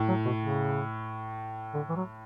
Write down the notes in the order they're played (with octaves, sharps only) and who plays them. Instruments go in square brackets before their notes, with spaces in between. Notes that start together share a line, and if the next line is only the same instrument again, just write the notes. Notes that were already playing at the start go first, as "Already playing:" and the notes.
Already playing: [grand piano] A2
[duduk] F#3
B2
C#3
D3
E3
F#3